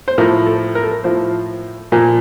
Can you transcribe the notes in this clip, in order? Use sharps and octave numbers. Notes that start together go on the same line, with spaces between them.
C5
A2 F3 A#4
A4
A#4
A4
A#4
A2 F3 C5
A#2 F3